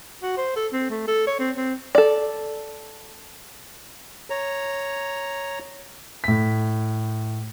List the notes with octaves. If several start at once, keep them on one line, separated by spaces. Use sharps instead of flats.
F#4
C5
A4
C4
A3
A4
C#5
C4
C4
A4 D5
C#5 A#5
A2 B6